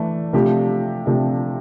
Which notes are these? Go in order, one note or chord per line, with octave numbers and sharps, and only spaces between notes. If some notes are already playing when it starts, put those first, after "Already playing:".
Already playing: E3 A3 D4
C3 F3 A3 D4 G4
C3 F3 A3 D4 G4